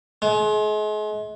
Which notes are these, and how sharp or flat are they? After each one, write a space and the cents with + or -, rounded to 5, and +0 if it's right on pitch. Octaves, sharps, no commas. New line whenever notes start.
G#3 +35